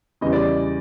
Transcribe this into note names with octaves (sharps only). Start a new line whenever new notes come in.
E2 C#3 E3 G3 D#5
D5